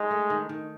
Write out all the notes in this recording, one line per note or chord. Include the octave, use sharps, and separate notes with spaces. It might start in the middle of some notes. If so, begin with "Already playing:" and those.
Already playing: G#3 D#4
A3
D#3
D#3